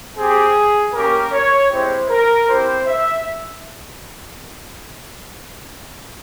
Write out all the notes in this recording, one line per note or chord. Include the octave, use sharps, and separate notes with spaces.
C4 G4 G#4
A#3 C#4 G4 A#4
C#5
G#3 C4 E4 G4 C5
A#4
C4 E4 G4 C5
E5